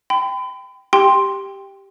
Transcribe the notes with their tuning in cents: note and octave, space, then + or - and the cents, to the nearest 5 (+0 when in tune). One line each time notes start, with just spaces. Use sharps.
G5 +0 B5 +40
G4 +0 G5 +15 C6 +0